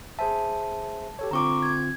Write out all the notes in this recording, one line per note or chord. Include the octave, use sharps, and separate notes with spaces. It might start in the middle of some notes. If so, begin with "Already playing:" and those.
G#4 C5 E5 A5
G4 A4 C#5
D3 C4 F4 A#5 C#6 D6
G#6